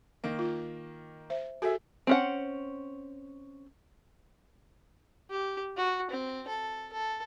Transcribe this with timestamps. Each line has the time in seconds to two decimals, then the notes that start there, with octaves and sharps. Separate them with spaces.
0.24 D#3 A#3
0.39 F4
1.30 C5 E5
1.62 F#4 G#4 A4 E5
2.07 C4 C#4 F#5
5.30 G4
5.77 F#4
6.11 C4
6.48 A4
6.93 A4